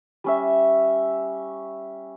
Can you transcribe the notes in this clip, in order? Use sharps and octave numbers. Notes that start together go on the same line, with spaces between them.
G3 C#4 E5